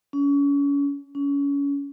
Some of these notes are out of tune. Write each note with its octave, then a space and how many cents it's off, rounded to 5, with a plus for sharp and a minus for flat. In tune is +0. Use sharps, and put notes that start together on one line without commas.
C#4 +35
C#4 +30